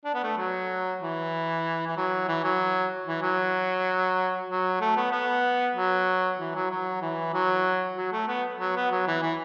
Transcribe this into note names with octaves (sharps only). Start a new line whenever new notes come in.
D4
B3
A3
F#3
E3
E3
F#3
E3
F#3
E3
F#3
F#3
A3
B3
B3
F#3
E3
F#3
F#3
E3
F#3
F#3
A3
B3
F#3
B3
F#3
E3
E3